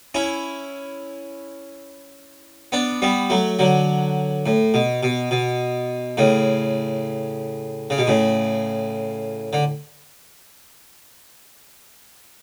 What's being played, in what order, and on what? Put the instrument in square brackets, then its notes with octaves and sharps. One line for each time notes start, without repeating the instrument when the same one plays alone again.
[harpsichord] C#4 E4
B3 D4
G3 B3
F#3 A3
D3 F#3
A2
B2
B2
B2
A2 C#3
C#3
B2
A2 C#3
D3